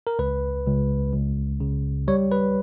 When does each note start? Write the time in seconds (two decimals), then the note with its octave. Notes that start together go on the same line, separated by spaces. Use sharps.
0.07 A#4
0.19 C#2 B4
0.66 C#2
1.13 C#2
1.60 C#3
2.08 G3 C#5
2.32 B4